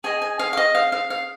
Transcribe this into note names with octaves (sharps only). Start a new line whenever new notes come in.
G#4 D#5 G#5
G#5
F5
F5
D#5
F5
F5
F5